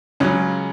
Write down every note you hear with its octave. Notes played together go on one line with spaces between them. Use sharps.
C#2 C#3 F#3 C#4